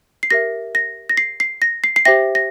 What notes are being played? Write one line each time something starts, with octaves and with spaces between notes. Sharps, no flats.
C7
G4 A#4 E5 A#6
A#6
A#6
C7
C7
A#6
C7
C7
G4 C5 E5 G5 A#6
A#6